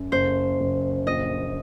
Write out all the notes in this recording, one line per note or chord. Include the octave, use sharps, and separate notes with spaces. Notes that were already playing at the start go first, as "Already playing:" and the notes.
Already playing: F#2
F#1 C5
F#1
A#1 D#5